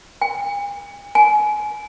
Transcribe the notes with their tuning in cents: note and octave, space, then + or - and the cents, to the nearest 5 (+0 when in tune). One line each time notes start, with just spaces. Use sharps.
G#5 -45
G#5 +25